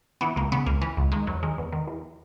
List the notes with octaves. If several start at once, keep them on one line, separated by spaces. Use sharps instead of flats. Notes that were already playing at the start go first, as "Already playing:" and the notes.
E3 B3
C#2 A#3
C#3 B3
C#2 A#3
E3
C#2
D#3 G#3
E2 F#3
D#3 G#3
E2
D#3
E2